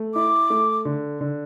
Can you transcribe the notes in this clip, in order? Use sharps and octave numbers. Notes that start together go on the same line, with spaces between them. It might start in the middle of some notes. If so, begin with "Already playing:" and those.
Already playing: A3
E4 D6
A3
D3
D3